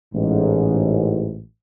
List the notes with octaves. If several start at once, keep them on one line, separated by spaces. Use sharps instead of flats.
A1 G#2